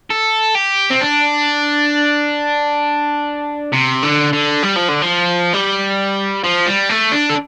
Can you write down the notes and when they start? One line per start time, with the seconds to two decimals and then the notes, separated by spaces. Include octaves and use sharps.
0.10 A4
0.55 G4
0.90 C4
1.01 D4
3.72 C3
4.03 D3
4.33 D3
4.63 G3
4.76 F3
4.88 D3
5.02 F3
5.53 G3
6.44 F3
6.66 G3
6.89 A3
7.12 D4
7.30 A4